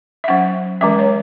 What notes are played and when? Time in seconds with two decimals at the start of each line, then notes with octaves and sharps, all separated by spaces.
0.24 E5
0.28 F#3 C#4 F#5
0.81 E3 G#3 C#4 E5
0.99 C#5